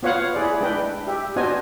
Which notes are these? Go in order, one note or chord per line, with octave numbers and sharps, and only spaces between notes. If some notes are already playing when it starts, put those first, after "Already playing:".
B3 F4 C#5 F5 F#5
E4 G#4 D5
G#3 D4 E4 B4 G5
G4 E5
B3 D4 F#4 C5 D#5 G#5